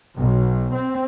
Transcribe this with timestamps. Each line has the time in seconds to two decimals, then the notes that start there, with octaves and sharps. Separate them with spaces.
0.17 B1
0.75 C4